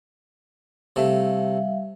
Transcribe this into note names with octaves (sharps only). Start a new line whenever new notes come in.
C3 G3 A3 E5 F5